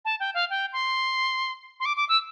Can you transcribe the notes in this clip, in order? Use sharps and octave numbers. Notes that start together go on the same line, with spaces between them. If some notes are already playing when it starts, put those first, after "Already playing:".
A5
G5
F5
G5
C6
C6
D6
D6
E6